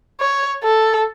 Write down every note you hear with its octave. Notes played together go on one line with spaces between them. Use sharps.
C#5
A4